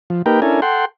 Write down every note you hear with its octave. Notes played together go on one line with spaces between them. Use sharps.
F3
A#3 D#4 G4 A#4 B4 G5
C#4 D4 E4 A4 A#4 G#5
A4 F#5 G5 C6